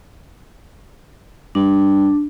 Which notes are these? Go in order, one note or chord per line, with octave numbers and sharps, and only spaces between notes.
G2 D4